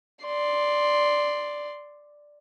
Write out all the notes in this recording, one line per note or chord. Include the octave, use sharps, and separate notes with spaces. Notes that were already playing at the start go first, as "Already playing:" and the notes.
D5 C6